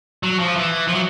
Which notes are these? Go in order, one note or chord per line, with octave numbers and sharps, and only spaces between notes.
F#3
F3
E3
F3
F#3